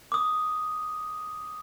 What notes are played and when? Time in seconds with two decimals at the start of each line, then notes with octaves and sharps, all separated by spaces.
0.12 D6 D#6